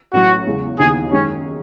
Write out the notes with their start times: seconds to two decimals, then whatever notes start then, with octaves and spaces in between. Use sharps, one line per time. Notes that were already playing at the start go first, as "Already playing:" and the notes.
0.13 A1 A2 F#3 F#4
0.46 E2 C#3 G#3
0.79 D#2 C#3 E3 B3 D#4 G#4
1.12 F#2 D#3 G#3 C#4